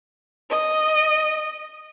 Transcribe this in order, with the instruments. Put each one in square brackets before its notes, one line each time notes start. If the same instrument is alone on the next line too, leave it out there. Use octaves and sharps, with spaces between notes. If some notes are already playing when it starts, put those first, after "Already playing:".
[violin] D#5